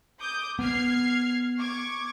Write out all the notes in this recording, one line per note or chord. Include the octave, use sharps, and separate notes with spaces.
D6 D#6 G6
B3 F6 G#6 C7
C#6 D6 G#6